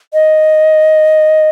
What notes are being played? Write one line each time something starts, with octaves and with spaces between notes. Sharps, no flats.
D#5